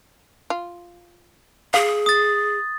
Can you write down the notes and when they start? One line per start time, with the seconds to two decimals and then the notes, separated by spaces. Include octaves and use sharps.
0.50 F4
1.74 G#4 F5
2.06 D#6 A6